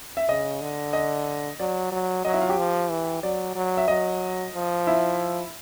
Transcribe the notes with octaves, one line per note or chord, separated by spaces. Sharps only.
E5
C#3 D#5
D3
D#5
F#3 D5
F#3
F#3 D#5
E4 E5
F4 F5
G4 G5
F3
E3
F#3 D5
F#3
E5
F#3 D#5
F3
E4 E5